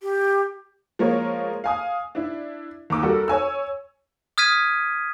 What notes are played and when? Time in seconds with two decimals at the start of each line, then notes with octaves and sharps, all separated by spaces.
0.02 G4
0.99 F3 G#3 A#3 A#4 C#5
1.64 F5 G#5 D#6
2.15 D4 E4
2.90 D#2 A#5 D6 E6
3.03 G3 F#4 A4 A#4
3.28 C#5 G#5 E6
4.38 D#6 F6 G#6 B6 D#7